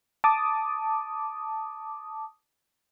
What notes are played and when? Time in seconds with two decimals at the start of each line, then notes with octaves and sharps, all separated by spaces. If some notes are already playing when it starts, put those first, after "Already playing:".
0.24 A5 D6 D#6